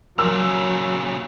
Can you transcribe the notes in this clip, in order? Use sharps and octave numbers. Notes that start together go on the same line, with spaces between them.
A#2 C#3 F#3 A#4 E6